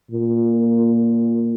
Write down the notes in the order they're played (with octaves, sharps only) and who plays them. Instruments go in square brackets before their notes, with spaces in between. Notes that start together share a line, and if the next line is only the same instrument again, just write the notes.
[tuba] A#2